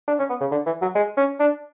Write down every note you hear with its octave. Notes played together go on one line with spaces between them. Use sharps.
D4
C#4
B3
C#3
D3
E3
F#3
G#3
C#4
D4